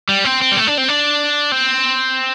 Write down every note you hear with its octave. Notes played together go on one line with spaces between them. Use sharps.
G3
C4
C4
G3
A3
D4
C4
D4
C4